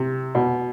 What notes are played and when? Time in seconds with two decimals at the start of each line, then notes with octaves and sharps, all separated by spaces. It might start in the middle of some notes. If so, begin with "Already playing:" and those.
Already playing: C3
0.35 B2